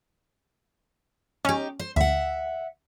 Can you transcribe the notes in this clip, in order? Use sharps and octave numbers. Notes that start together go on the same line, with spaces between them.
C#4 D#4 G4
C5
D2 E5 F#5